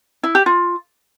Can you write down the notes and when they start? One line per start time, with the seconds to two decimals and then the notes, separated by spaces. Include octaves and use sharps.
0.23 E4
0.35 G4
0.46 F4